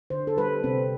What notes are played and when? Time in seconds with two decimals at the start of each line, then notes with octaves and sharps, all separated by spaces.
0.10 D3 C5
0.27 A4
0.37 G3 B4
0.64 C3 C4